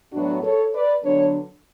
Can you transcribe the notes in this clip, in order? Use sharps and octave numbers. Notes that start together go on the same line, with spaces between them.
A2 F#3 B3 D4 F#4
A4 C#5
B4 D5
D3 F#3 B3 D4 A4 C#5